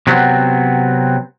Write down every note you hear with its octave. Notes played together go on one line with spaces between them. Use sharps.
C3 F#3 B3 C4